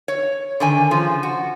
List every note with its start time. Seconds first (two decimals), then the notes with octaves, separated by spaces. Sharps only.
0.08 C#5
0.60 D3 D#3 G#5
0.91 C#3 F3
1.23 F#4